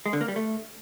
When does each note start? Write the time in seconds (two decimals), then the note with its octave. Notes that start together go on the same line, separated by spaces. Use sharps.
0.06 G#3
0.13 D3
0.21 A#3
0.28 G3
0.36 A3